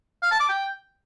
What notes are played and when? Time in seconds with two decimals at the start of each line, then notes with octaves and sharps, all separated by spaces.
0.22 F5
0.31 A5
0.40 D6
0.49 G5